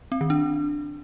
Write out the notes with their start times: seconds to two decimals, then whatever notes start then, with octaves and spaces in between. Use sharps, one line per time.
0.12 C4
0.21 D#3
0.30 D4